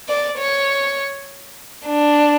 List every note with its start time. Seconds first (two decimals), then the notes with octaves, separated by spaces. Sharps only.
0.09 D5
0.38 C#5
1.86 D4